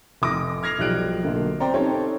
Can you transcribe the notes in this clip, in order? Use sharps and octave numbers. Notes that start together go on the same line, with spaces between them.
F1 D6 D#6 A#6
F6 G#6 A#6 C7 F7
B1 F3 G3 F#6 D7
B1 D3 A#3
C4 C5 D5 G5 A#5
C4 C#4 D#4 G4 A4 C#5